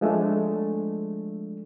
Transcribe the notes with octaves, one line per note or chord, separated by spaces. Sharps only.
F3 G#3 A3 D4